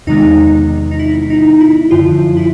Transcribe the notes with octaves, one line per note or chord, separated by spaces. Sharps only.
E2 C3 D#3 G#3 B3 D#4
D#4
E4
D#4
E4
F#2 D3 F3 F4
E4